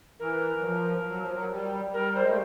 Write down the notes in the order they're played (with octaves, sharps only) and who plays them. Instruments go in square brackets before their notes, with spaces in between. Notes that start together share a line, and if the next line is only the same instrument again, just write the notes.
[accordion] E3 [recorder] A#4
[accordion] F#3
F3
F#3
F3
F#3
G3
[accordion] G3 [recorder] A#4
[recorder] C5
[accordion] G#3
A3